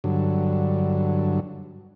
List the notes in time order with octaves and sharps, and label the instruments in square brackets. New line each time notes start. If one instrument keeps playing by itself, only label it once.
[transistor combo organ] G2 D3 F#3